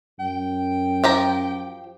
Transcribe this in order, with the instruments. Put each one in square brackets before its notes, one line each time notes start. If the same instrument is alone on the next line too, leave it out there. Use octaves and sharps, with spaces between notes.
[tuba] F#2 [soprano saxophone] G5
[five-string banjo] F3 G4 A#5